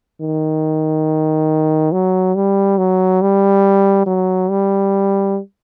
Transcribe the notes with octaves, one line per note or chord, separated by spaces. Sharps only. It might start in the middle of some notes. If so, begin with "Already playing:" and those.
D#3
F#3
G3
F#3
G3
F#3
G3